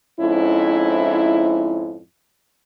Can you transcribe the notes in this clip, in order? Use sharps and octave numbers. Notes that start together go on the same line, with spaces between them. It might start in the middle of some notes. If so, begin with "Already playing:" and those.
F2 G#2 C#4 E4